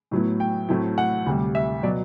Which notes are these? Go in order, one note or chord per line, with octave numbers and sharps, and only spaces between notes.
A2 F#3 B3 E4
G5
A2 F#3 A3 C4 E4
F#5
D2 C3 G3
E5
B2 F#3 D5